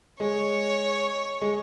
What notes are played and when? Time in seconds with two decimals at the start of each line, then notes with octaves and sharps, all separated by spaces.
0.20 G#3 C#5
1.41 G#3